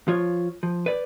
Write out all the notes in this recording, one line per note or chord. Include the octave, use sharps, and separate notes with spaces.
F3 F4 C#5
F3
B4 D5